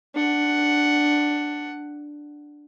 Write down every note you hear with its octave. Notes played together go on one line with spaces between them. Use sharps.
D4 F#5